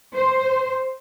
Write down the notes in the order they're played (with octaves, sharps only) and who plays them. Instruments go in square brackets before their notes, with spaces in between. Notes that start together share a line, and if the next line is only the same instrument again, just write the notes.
[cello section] C5